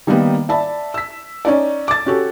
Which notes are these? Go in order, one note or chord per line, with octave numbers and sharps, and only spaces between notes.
D#3 G3 A#3 B3 D#4
D5 E5 A5 B5
E6 B6
C#4 D#4 D5
D6 A6
C#4 F#4 G4 A4